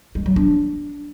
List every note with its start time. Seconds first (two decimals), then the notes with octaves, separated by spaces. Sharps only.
0.15 G#3
0.26 F#3
0.36 D4